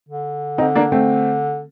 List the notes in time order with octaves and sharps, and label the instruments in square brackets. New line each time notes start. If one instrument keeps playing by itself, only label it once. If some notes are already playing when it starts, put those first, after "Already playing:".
[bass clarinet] D3
[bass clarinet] D3 [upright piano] C4 D#4
[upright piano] A#3 D4
A3 C4